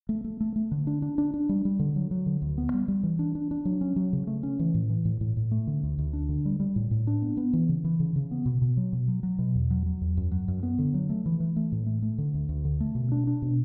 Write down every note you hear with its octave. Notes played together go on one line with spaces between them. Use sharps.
A3
A3
A3
A3
D3
D4
D4
D4
D4
G3
G3
D3
F#3
F#3
D3
D2
B3
G3
G3
E3
D4
D4
D4
F#3
C#4
F#3
C#3
A3
C#4
E3
A2
E3
A2
A2
A2
A3
D3
D2
D2
D4
D3
G3
G3
A2
A2
D4
B3
B3
E3
C#3
E3
C#3
C#3
B3
B2
B2
F#3
B2
F#3
F#3
B2
E2
F#3
F#3
E2
F#2
F#3
F#2
B3
D3
F#3
A3
E3
E3
A3
A2
A3
A3
D3
D2
D2
D3
A3
B2
D4
D4
B2